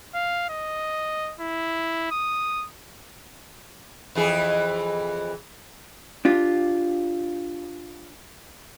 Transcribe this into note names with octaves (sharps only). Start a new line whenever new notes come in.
F5
D#5
E4
D#6
F2 E3 G#4
D4 F4 G4